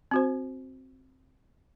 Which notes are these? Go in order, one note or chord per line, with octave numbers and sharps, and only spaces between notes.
C4 F#4 C5